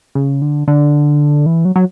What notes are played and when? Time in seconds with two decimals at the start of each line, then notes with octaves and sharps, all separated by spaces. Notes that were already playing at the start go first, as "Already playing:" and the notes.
0.15 C#3
0.42 D3
0.68 D3
1.46 E3
1.65 F#3
1.76 F#3